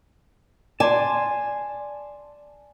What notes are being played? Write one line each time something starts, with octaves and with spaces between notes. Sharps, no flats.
D5 G#5 A5 C6